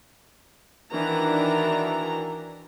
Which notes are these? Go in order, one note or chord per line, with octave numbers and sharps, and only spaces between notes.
D#3 E3 D4 F#4 A#5